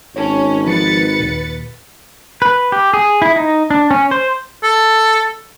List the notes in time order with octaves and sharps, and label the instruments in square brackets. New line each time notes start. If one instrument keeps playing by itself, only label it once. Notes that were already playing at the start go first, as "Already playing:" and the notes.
[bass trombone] G#1 [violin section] C#4 [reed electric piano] C#5 A5
[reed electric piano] F3 [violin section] B4 A6 C#7
[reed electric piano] D#2 A#2
[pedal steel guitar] B4
G4
G#4
E4
D#4
D4
C#4
C5
[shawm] A4